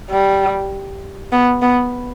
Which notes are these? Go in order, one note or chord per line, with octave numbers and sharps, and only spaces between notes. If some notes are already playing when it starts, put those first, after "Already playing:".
G3
B3
B3